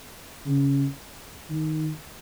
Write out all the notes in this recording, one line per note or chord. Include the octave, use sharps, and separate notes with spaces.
C#3
D#3